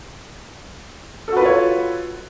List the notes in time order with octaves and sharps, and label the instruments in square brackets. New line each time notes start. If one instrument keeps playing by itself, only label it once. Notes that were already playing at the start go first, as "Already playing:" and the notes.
[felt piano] A4
F#4
B4
F4
C#5